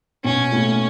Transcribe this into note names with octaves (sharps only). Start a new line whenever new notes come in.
B2 C#4
A2